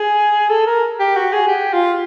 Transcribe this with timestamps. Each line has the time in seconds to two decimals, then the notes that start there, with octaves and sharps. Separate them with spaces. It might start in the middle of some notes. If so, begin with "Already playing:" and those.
Already playing: G#4
0.50 A4
0.67 A#4
1.00 G4
1.16 F#4
1.33 G#4
1.48 G4
1.73 F4